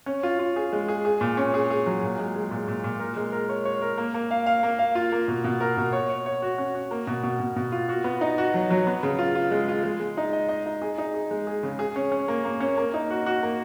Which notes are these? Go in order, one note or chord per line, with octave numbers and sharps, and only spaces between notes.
C#4
F4
F4
G#4
G#3
G#4
G#4
A#2
C#4
G#4
G#4
F#3
A#2
G#3
G#3
A#2
A#2
A#2
A#4
G#3
A#4
C#5
C#5
A#4
A#3
A#3
F5
F5
A#3
F5
F4
A#3
B2
B2
A#4
B2
C#5
C#5
C#5
F#4
C#4
F#4
A#3
B2
B2
B2
B2
F4
F#4
B3
D#4
F#4
F#3
F#3
B3
C#3
F4
F4
G#3
F4
G#3
G#3
D#4
D#5
D#5
D#4
G#4
D#4
G#4
G#3
G#4
C#3
G#4
C#4
C#4
A#3
A#3
C#4
A#3
D#4
F#4
F#4
A#3